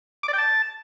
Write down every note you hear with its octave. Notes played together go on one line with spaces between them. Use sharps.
D6
D5
G5
A5